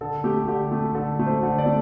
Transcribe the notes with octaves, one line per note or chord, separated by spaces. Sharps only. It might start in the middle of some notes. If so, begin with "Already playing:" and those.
D3 A4
A3 G4
D3 G4
A3
D3 A4
A3
C5
D3
D5
A3